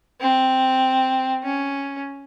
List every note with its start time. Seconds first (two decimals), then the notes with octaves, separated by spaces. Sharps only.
0.21 C4
1.44 C#4